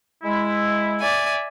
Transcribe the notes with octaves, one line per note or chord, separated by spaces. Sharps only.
G#3 E4
D5 E5 G#5